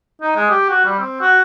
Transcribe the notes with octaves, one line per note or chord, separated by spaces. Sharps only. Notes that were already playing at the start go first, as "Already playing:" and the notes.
D#4
G#3
G4
F#4
G3
C4
F#4